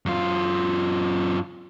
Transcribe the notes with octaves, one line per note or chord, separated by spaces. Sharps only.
F#2 F4